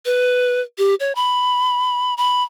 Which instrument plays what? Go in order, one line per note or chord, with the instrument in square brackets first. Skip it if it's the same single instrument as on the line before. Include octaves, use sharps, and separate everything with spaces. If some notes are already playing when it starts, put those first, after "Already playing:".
[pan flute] B4
G4
C#5
B5
B5